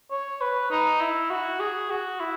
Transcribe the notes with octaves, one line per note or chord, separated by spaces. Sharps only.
C#5
B4
D#4
E4
F#4
G#4
F#4
E4